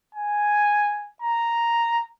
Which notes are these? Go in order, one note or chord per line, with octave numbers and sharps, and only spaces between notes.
G#5
A#5